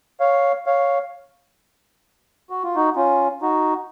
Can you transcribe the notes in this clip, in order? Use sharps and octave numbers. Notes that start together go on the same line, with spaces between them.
C#5 F5
C#5 F5
F#4
F4
D#4 F#4
C#4 F4
D#4 F#4